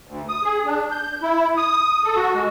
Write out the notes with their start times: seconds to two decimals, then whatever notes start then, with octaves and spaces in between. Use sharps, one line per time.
0.07 D2
0.29 D#6
0.43 G#4
0.66 D4
0.91 G6
1.22 E4
1.57 D#6
2.04 A4
2.16 F#4
2.34 G#3